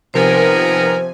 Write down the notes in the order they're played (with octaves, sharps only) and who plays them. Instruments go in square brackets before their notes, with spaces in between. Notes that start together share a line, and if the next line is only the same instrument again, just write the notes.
[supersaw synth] C3 F3 G#5 [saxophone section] D#3 B3 A#4 [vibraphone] C5